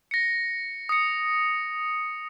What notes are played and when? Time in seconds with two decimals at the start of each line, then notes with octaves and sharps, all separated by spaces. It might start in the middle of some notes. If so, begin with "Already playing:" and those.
0.11 A#6 C#7
0.89 D#6 C#7